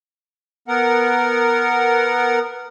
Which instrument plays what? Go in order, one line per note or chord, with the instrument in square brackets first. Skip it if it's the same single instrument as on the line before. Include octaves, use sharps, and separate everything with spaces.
[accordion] B3 A#4 F#5